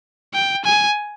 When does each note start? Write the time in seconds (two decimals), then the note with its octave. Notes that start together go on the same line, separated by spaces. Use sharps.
0.34 G5
0.64 G#5